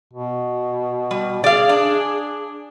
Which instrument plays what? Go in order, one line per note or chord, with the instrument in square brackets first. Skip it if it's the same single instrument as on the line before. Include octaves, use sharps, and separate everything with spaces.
[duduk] B2
[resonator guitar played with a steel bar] G3
[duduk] G#4 [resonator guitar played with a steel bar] D5 F5
[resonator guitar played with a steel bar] D4